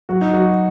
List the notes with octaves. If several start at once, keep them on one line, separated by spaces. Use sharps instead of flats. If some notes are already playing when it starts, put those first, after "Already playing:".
F#3 F#4
D#4
F#3 F#4